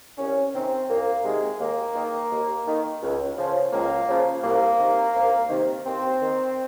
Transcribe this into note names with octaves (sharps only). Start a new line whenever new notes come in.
C2 C#4
C3 D#3 C4
C2 A#3
C3 D#3 G#3
D#2 A#3
D#3
D#2
D#3
C#2
C#3 F3
C#2 A#3
C#3 F3
C2 A#3
C3 D#3
C2
C3 D#3
D#2 C4
D#3